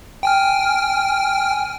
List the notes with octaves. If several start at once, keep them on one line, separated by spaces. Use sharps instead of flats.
G5 G#5 F6